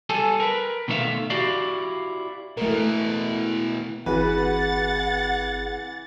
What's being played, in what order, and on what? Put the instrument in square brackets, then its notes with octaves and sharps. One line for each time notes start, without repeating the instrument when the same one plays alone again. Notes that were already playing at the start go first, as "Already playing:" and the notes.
[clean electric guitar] G3 A4 G#5 A5
A#4 B4
B2 D#3 A3 G#4 E5 F5
E4 F#4 G4 D5 F5
[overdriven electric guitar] B2 E3 [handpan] A3 A#4
[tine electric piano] G1 C4 G#4 [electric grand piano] E3 [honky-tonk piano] F#4 B4 [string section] F#5 A6